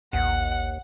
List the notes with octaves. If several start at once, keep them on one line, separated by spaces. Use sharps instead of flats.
A1 D#2 F#5